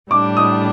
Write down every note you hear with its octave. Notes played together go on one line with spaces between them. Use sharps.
A2 G3 D4 D6
D#6